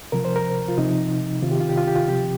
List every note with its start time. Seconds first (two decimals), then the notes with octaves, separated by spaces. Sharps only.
0.12 C3 F3 A#4
0.25 C5
0.36 A#4
0.68 F4
0.77 C3 F3 D#4
1.42 C3 D#3 F4
1.51 G4
1.60 F4
1.69 G4
1.78 F4
1.87 G4
1.95 F4
2.08 C3 F3 G4